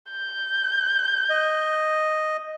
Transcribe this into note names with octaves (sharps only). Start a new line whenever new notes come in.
G6
D#5